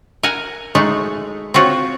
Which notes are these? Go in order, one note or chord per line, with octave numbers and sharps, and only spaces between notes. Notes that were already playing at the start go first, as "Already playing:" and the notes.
A#4 F#5 G#5 A#5
G#3 A3 D#4 F#4
C4 F4 F#4 C#5